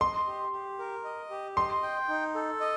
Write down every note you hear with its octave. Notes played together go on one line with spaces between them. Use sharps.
D#5 C6
G4
G4
A#4
D#5
G4
D#5 C6
G5
D#4
A4
D#5